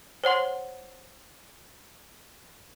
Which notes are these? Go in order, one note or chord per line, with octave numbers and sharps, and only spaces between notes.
C5 C#5 F#5 C6